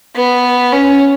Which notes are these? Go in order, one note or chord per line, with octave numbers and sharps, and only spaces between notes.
B3
C#4